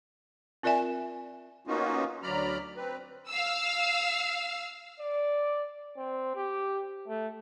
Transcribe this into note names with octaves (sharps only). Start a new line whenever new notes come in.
C4 F4 A#4 D5 E5 G#5
A#3 B3 C#4 D#4 F4 F#4
D2 F#3 D5 A#5 B5 F6
C4 B4
F5 E6
D5
C4
G4
A3